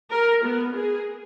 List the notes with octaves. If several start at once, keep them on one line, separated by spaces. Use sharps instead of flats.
A#4
B3
G#4